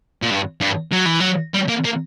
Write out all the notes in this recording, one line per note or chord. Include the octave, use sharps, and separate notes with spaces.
A#2
G2
G2
F#3
E3
F#3
G3
A#3
A#3